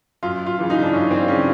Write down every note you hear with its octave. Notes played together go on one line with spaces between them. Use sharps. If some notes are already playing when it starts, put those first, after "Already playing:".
F#2 F4
F4
C#3 E3
D#4
D4
F#2 C#4
C4
C#3 E3 C#4